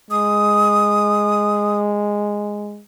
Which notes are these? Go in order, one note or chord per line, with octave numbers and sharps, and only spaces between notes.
G#3 D#6